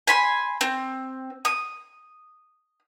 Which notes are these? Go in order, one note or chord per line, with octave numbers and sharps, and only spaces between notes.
G#5 B5 C6
C4
D#6